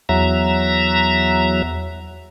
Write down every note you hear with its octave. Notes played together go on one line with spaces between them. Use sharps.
E2 F#3 E5 A#5